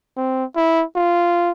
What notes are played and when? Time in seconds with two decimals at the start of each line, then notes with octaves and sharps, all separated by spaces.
0.17 C4
0.56 E4
0.96 F4